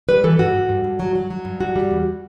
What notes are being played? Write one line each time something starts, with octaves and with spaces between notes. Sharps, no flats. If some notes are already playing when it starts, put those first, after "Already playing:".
G3 B4
E3 A4
G2 F#4
G2
G2
G2
F#3
F#3
F#3
G2
G3 F#4
G3
E2